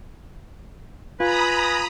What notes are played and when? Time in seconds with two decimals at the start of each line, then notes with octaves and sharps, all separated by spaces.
1.20 F4 B4 G#5 A#5 B5 D#6